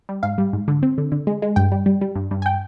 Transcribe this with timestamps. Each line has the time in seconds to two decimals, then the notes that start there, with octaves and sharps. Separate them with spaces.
0.09 G3
0.23 G#2 F5
0.38 G3
0.53 G#2
0.68 D3
0.83 C4
0.98 D3
1.12 D3
1.27 G#3
1.42 G#3
1.56 G2 G5
1.72 G3
1.86 G3
2.01 G3
2.15 G2
2.31 G2
2.42 G#5
2.46 G5